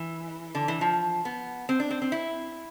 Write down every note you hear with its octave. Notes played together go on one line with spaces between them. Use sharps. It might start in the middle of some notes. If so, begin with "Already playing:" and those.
Already playing: E3
D3
E3
F3
B3
C4
D4
C4
C4
E4